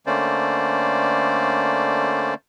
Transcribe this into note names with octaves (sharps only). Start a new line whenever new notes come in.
D3 A3 A#3 C#4 C5 D5